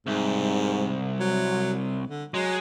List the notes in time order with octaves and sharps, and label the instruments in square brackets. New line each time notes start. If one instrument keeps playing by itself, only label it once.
[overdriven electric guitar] C2 [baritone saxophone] G#2
[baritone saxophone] F#3
D3
[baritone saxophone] F#3 [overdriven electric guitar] G#3